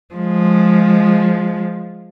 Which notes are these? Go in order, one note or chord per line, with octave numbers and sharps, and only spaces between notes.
F3 G#3